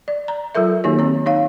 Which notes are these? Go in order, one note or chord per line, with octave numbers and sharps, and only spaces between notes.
D5
A#5
F#3 F4 A4 A#4 E5
D#3 A#3 D#4 F#4 G4 C#5
C4 C#5
D#4 C#5 F5